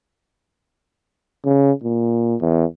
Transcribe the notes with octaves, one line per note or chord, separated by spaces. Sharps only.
C#3
A#2
E2